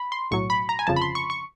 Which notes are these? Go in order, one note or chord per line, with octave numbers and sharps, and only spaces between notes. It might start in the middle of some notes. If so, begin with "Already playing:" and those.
Already playing: B5
C6
B1 A2 F#3 C#6
B5
A#5
G#5
G1 F2 C#3 F3 A5
B5
C6
C#6
C#6